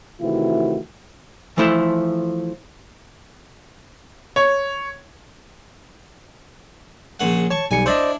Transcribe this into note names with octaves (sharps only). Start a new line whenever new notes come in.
C3 D#3 E3 A3 E4 F#4
E3 F3 A3 E4 A4 C5
C#5
A#1 C#3 F#5
C#5 A5 C#6
B1 G3 G#5 C#7
D4 E4 C5 D5 D#5